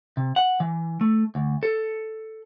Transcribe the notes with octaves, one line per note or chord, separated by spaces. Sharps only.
C3
F#5
E3
A3
D2
A4